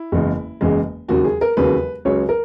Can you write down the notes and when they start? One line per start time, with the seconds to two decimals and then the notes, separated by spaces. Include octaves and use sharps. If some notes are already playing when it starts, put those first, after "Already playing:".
Already playing: E4
0.12 F#1 E2 C#3 G#3
0.61 F#1 E2 C#3 G#3
1.08 E1 D#2 C#3 F#3 F#4
1.25 G#4
1.41 A#4
1.57 E1 D#2 C#3 F#3 B4
2.05 C#2 C#3 F#3 C#5
2.29 A#4